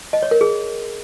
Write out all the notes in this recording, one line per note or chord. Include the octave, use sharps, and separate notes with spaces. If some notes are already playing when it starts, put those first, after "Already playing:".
D#5
C#5
A#4
G#4